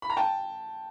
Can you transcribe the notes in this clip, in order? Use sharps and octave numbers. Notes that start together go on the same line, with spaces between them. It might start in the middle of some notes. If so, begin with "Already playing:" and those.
B5
A#5
G5 A5